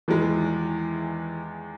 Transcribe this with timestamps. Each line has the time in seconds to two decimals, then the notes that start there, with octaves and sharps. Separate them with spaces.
0.08 E2 D#3 E3 G#3